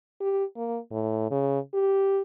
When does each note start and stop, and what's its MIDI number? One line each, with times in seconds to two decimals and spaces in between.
0.20 0.44 67
0.56 0.78 58
0.91 1.29 45
1.31 1.59 49
1.74 2.22 67